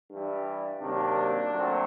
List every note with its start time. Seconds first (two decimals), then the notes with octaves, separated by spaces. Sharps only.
0.10 G2 E3 G3
0.80 C3 D#3 F#3 A#3 D4
1.51 A#2 F#3 A3 C4